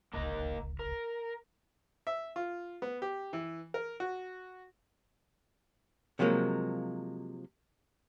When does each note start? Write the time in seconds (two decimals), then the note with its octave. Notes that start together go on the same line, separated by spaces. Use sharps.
0.13 D1 G#1 C#2 A#3 A#4 D#5
0.79 A#4
2.07 E5
2.36 F4
2.82 B3
3.02 G4
3.33 E3
3.74 A#4
4.00 F#4
6.19 C3 F3 F#3 G#3 A#3